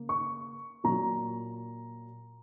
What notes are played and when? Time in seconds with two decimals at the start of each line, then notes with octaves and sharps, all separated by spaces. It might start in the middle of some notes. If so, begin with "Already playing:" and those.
Already playing: C#3 A#3
0.09 C#6
0.84 A#2 F#3 A#3 A#5